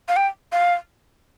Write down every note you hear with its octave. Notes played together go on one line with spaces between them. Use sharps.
F5
G5
F5